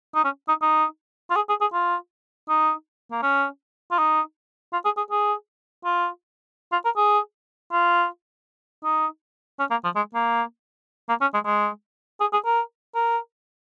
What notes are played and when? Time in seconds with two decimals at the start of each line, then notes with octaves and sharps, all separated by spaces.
0.15 D#4
0.24 C#4
0.48 D#4
0.62 D#4
1.30 F4
1.36 G#4
1.49 G#4
1.61 G#4
1.73 F4
2.49 D#4
3.11 A#3
3.23 C#4
3.91 F4
3.98 D#4
4.73 F4
4.85 G#4
4.97 G#4
5.11 G#4
5.85 F4
6.72 F4
6.85 A#4
6.96 G#4
7.72 F4
8.84 D#4
9.59 C#4
9.71 A#3
9.84 F3
9.95 G#3
10.14 A#3
11.09 A#3
11.21 C#4
11.34 G#3
11.45 G#3
12.20 G#4
12.33 G#4
12.45 A#4
12.95 A#4